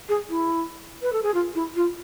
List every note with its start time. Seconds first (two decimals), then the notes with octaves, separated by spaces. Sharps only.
0.09 G#4
0.30 E4
1.02 B4
1.13 A4
1.23 G#4
1.34 F4
1.55 E4
1.76 F4